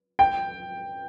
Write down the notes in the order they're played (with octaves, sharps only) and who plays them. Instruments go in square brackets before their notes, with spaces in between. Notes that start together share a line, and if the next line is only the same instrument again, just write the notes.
[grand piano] G5